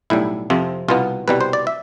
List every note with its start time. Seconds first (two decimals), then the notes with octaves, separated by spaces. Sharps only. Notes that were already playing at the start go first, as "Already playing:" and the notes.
0.10 B1 A2 G3 E4
0.50 F2 C3 F3 C4
0.88 C2 B2 B3 F4
1.28 C2 B2 G3 B4
1.41 C5
1.53 D5
1.67 E5